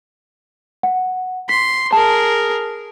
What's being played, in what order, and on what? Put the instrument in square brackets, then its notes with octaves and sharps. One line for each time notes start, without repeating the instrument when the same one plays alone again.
[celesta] F#5
[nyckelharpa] C6 [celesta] B6
[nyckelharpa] G#4 A#4 [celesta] A5